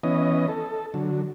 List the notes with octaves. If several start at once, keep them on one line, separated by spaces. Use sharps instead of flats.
E3 B3 C#4 D#5
A4
D3 F#3